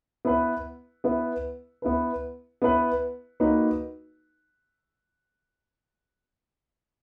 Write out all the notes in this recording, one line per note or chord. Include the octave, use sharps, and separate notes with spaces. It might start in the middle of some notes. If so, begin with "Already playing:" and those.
B3 E4 B4
B3 E4 B4
B3 E4 B4
B3 E4 B4
A#3 D#4 F#4 B4